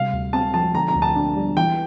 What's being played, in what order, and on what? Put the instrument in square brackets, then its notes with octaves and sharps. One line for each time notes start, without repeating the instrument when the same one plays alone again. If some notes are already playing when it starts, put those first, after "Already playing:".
Already playing: [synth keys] C3 G3 [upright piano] F5
[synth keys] D2
[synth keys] C4 [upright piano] A5
[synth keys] F3 [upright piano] A5
[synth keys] D3 [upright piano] A#5
[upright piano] A#5
[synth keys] D2
[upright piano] A5
[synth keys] D4
G3
[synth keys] E3 [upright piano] G5